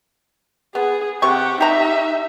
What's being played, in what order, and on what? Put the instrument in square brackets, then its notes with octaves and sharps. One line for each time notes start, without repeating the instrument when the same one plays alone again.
[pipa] B3 [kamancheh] G#4
[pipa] C3 C#6 [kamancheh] G4 F#5
[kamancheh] D#4 E5 [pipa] G4 A#5